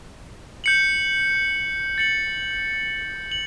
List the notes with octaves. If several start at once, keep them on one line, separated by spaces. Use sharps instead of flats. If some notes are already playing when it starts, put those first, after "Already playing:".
G6 C#7 F#7
A6 C#7 F#7
F#7